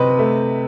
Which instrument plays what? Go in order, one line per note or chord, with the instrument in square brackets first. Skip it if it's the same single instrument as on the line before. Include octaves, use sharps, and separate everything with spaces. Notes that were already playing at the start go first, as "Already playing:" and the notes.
Already playing: [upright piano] C3 C4 B4 D#5
A3